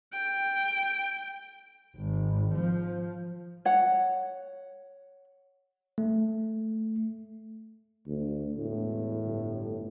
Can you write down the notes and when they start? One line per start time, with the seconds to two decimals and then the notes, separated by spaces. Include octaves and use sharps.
0.14 G5
1.97 G#1
2.55 F3
3.65 C#5 F#5
5.98 A3
8.07 D2
8.58 E1 A2
9.24 G1